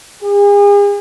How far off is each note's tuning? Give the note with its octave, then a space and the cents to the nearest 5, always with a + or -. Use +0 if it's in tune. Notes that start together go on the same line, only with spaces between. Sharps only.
G#4 -40